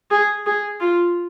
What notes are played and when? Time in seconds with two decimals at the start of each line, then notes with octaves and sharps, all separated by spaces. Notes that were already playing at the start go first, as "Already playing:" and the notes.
0.11 G#4
0.46 G#4
0.80 F4